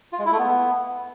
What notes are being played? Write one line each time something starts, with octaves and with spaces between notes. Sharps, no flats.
F4
G#3
E4
A3
B3